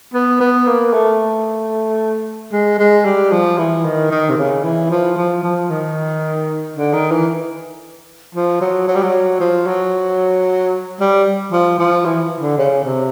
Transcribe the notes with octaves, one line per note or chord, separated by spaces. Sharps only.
B3
B3
A#3
A3
G#3
G#3
G3
F3
E3
D#3
D#3
C3
C#3
E3
F3
F3
F3
D#3
D3
D#3
E3
F3
F#3
F#3
G3
F#3
F3
F#3
G3
F3
F3
E3
D3
C#3
C3